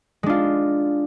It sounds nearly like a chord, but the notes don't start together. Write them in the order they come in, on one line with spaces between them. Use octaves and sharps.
G#3 D4 F4